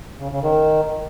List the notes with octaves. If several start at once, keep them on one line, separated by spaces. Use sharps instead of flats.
C#3
C#3
D#3